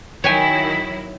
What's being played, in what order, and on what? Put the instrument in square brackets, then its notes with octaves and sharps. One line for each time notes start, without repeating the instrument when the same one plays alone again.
[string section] D#3 F#3 E4 [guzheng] C#5 G5 G#5 [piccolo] B6